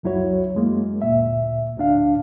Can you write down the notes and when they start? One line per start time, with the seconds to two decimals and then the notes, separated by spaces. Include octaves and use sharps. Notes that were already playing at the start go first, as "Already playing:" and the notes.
0.03 C#2 F#2 F#3 E4 F#4 C#5
0.55 F#2 G#3 A#3
1.02 D2 A#2 E5
1.77 D2 A2 D4 F5